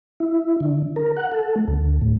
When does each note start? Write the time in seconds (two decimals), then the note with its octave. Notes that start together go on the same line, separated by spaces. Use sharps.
0.20 E4
0.60 D3
0.96 A#4
1.17 F#5
1.32 A4
1.56 A3
1.68 D2
2.01 A2